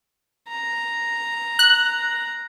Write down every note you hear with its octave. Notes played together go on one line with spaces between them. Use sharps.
A#5
F#6